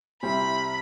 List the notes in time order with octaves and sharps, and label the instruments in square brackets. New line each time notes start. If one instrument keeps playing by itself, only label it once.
[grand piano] C2 C3 G3 C4 E4 [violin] B5